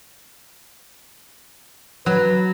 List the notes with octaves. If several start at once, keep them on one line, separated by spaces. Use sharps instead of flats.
F#3 B4